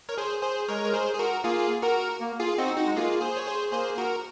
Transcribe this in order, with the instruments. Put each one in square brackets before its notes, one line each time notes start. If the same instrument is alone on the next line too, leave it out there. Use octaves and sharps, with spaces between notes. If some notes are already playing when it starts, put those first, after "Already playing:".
[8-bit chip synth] A#4 C#5
G#4 C5
G#4 C5
[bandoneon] G#3 [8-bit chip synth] A#4 C#5
[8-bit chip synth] A#4
G#4 C5
G#4
F#4 A#4
[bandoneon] A#3 [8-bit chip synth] F4 G#4
[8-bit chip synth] F#4 A#4
[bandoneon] A#3
[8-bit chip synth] F4 G#4
[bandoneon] C4 [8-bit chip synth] D#4 F#4
[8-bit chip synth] D#4 F#4
[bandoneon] G#3
[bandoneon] A#3 [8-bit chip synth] F4 G#4
[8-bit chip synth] G#4 C5
C#5
G#4 C5
[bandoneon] A#3 [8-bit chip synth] G#4 C5
[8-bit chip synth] F#4 A#4